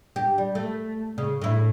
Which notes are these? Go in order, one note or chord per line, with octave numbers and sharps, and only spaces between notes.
G4
G3
A3
C#3
A2 E4